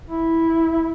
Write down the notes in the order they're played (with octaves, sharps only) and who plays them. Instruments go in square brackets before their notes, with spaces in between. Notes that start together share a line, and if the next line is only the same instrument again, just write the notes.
[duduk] E4